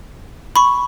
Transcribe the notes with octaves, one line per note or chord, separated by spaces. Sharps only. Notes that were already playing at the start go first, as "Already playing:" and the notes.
B5 C#6